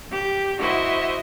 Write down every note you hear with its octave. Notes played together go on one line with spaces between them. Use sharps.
G4 G6
E4 F#4 C5 D#5 E5